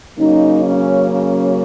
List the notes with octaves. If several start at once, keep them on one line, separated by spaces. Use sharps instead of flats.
C#3 F#3 A#3 C#4 D#4
C#4
C#4